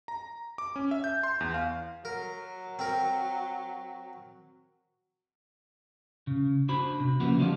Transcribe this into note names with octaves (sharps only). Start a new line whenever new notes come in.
A#5
D6
C#4
E5
G6
C6
E2
F5
F#3 A#4
C4 A#4
C#3
D4 F#4 C5 B5
C3
C#3 F3 A#3 B3 E4 F#4
D3 F3 G3 G#3 D4 F4